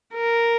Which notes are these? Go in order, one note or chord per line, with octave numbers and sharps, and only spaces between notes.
A#4